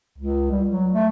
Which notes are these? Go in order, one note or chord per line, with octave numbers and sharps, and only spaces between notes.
C#2
G3
F#3
A3